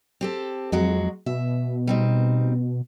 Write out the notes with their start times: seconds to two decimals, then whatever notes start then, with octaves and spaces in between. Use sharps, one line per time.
0.21 C4 G4 A4
0.72 F2 F#3 G#3 F#4
1.26 B2 E5
1.87 G3 C4 D#4